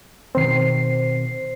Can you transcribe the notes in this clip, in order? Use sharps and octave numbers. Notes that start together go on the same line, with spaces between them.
B2 D#3 C4 C5 C7